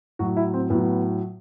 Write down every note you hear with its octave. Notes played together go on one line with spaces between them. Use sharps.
A2 F#3 F#4
E4
C4
A2 F#3 B3